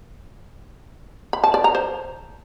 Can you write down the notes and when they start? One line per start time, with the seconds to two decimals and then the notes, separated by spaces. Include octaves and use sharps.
1.33 B5
1.44 A5
1.54 D5
1.64 A#5
1.75 C5